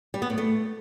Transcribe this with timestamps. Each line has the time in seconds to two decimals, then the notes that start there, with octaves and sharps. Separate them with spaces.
0.14 G3
0.22 B3
0.30 A2
0.38 A3